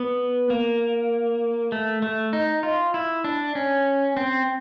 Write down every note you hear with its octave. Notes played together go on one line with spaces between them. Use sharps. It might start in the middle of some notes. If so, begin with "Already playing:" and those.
Already playing: B3
A#3
A3
A3
D#4
F4
E4
D4
C#4
C4